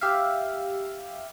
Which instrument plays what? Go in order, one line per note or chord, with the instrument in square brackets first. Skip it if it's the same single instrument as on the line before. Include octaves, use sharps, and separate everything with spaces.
[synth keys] G4 E5 F5